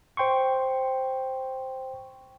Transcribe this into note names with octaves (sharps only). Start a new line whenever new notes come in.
C5 G5 C6 C#6